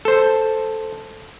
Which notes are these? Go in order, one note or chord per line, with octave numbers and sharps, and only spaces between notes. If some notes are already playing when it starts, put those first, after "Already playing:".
A4 C5